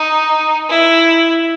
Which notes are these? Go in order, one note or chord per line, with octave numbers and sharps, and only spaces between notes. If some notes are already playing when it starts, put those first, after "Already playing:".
Already playing: D#4
E4